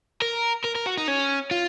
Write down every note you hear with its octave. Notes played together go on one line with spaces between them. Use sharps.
A#4
A#4
A#4
F#4
D#4
C#4
F4